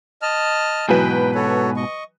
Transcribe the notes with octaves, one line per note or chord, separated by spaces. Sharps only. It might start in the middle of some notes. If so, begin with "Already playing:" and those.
D#5 A5 F6
G#2 B2 E3 F#3 B4 G5
F#4 A4 C#5
D#5 C#6